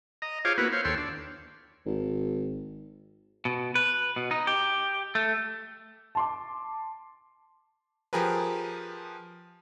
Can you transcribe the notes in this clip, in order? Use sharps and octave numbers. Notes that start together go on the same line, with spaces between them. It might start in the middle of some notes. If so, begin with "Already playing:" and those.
D#5 A#5
F4 G#4 C5 C#5 F5 D6
A#3 B3 E4 F#4 B4
C5 C#5 F5
D#2 A4 C#5 G5 C6 E6
D4
G#1
B2
B4
B2
D#4
G4
A3
A5 C6 D6
F3 G4 G#4 A#4 B4